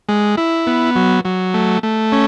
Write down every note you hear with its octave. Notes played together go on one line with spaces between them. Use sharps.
G#3
E4
B3
F#3
F#3
A3
A3
C#4